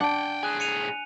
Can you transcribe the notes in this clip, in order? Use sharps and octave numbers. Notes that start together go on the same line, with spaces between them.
D4 F#5 G5
A2 G#4 G#5 F#6
C#7 D#7 F7